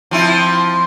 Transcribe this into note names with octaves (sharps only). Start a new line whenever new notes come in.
F3 C4 E4